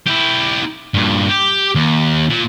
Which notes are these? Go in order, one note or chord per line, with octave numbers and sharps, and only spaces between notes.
E4 G4
G2 A#2
G4
D#2
A#2